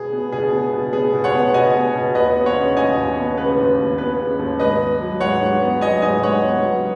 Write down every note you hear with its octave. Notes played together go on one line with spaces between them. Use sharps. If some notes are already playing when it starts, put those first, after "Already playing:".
Already playing: B2 B3 G#4
B3
B2 G#4
B3
B2
B3 G#4
B2
C#5 F#5
B3
B2 D#5 G#5
B3
B2
D#2 B4 D#5
B3
C#5 F#5
C#3
D#2 D#5 G#5
D#2
B3
C#3 B4
D#2
D#2
B3 B4
C#3
D#2
G#2 B4 D#5
B3
F#3
G#2 C#5 F#5
G#2
B3
F#3 D#5 G#5
G#2 D#5 G#5
G#2 C#5 F#5
B3
F#3